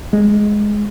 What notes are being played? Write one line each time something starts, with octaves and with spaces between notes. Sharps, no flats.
G#3